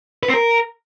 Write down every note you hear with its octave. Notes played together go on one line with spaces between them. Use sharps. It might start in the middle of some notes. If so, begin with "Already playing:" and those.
B4
C4
A#4